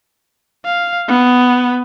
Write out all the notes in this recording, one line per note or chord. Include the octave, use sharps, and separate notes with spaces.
F5
B3